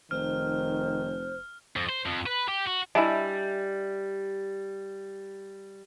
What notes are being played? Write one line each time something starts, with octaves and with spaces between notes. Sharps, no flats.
F1 D#3 C5 F6
F2
C5
F2
B4
G4
F#4
G3 D4 E4 D#5 E5 G#5